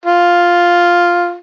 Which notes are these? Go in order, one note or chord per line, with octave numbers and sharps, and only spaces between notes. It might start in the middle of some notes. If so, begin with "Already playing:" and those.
F4